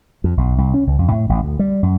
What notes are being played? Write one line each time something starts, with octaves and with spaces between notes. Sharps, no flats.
F2
B1
C2
C#4
C#2
F2
A2
A1
D2
G3
F#2